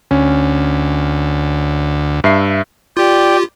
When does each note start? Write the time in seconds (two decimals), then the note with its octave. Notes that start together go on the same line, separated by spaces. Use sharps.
0.11 D2 C#4
2.24 G2 E5 C7
2.97 F4 G4 D5 G5